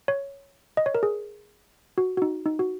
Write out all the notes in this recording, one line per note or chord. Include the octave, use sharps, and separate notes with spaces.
C#5
D#5
C#5
A#4
G#4
F#4
F#4
D#4
D#4
F#4